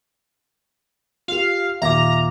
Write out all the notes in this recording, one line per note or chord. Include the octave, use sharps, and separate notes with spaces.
F4 G4 F5
D#2 A#2 E5 F5 A#5 D6 A#6